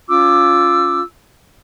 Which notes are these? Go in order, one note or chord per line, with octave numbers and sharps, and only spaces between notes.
C#4 F4 D6 E6